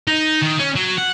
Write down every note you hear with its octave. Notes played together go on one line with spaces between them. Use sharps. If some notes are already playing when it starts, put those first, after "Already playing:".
D#4
D#3
C#4
F#3
F#5